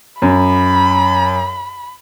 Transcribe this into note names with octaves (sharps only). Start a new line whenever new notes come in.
F#2 B5